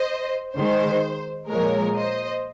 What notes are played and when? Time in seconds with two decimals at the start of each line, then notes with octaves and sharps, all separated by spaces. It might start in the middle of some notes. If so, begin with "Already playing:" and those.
Already playing: C5 D#5
0.56 D#3 G#3 C5
1.49 A#2 F3 G#3 A#4 C#5
1.96 C5 D#5